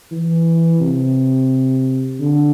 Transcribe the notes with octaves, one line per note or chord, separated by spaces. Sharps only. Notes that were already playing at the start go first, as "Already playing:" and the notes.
E3
C3
D3